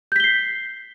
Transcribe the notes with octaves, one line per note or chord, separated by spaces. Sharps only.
G6 B6 C7 G7